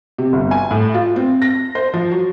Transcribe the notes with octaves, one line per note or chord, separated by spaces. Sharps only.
C3
G1
G#5
A2
F4
C4
A#6
C5
F3
F#3